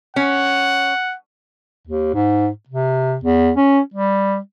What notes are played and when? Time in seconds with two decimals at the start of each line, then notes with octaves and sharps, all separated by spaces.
0.16 C#4 F#5
1.87 D#2
2.14 G#2
2.68 C3
3.24 E2
3.56 C#4
3.94 G3